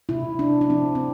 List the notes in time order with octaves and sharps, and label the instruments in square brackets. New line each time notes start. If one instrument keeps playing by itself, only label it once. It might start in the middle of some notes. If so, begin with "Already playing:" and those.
[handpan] C3 E4
C3 D4
D4
F3 C4
C4